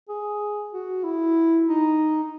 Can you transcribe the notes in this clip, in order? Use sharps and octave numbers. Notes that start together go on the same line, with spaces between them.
G#4
F#4
E4
D#4
D#4